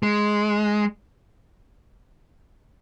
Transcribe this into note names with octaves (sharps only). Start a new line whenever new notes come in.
G#3